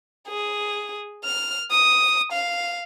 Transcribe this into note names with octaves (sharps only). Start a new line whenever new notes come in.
G#4
F6
D#6
F5